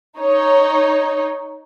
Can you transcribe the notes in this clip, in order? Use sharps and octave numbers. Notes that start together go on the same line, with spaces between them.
D#4 C#5